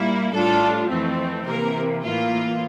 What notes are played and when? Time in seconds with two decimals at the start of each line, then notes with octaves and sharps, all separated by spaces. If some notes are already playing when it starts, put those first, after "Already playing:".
Already playing: A#2 G3 A#3 E4
0.32 A2 G3 D4 F4 A4
0.89 F2 E3 A3 C4
1.45 C3 E3 A#3 A#4
2.03 A2 E3 A#3 F4